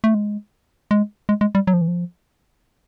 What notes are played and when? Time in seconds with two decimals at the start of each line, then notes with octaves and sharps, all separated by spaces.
0.04 A3
0.14 G#3
0.91 G#3
1.29 G#3
1.41 G#3
1.55 G3
1.67 F#3
1.74 F3
1.81 E3
1.88 F3